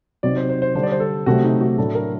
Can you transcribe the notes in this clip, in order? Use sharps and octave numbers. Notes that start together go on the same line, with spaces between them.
C3 F#3 C4 D#4 D5
C5
C5
C5
D3 G3 D4 C5
D5
C5
A4
C3 F#3 A3 C4 F#4
D#4
F#4
A2 F#3 A3 D4 A4
A#4